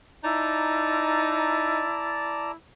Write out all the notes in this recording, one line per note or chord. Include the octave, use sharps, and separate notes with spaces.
D#4 E4 D5 A5 A#5